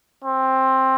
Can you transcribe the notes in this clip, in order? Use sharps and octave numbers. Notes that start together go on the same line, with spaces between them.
C4